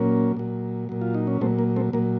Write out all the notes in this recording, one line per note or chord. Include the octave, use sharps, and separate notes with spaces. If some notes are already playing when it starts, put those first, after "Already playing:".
Already playing: A#2 F#3 A#3 C#4
A#2 F#3
A#2 F#3
F4
D#4
C#4
A#2 F#3 A3 C4
A#3
A3 C4
A#2 F#3 A#3